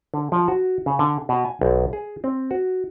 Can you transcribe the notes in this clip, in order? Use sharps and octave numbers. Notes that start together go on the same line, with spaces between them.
D3
F3
F#4
C#3
D3
B2
G#5
B1
G#4
C4
F#4